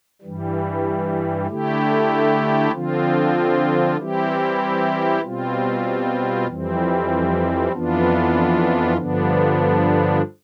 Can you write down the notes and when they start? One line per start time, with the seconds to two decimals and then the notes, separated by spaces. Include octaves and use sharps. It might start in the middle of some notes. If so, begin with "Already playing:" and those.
0.22 G2 E3 G3
1.47 D3 A3 E4 G4
2.72 D3 F3 C4 F4
3.97 E3 G3 C4 E4 G4
5.22 B2 G3 C4 F4
6.46 F2 E3 G3 C4
7.72 F2 E3 B3 D4 F4
8.97 G2 D3 F3 B3 D4